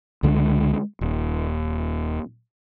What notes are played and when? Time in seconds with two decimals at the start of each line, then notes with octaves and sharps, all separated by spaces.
0.23 C#2 D3 G#3
1.01 D#1